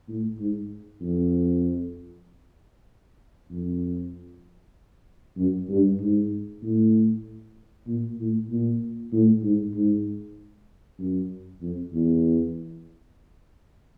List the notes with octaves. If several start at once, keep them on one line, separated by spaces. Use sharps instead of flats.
A2
G#2
F2
F2
F#2
G2
G#2
A2
A#2
A2
A#2
A2
G#2
G#2
F#2
F2
E2